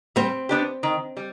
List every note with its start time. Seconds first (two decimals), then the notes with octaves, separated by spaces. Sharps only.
0.16 G3 C4
0.49 B3 D4 G4
0.83 D#3
1.17 G3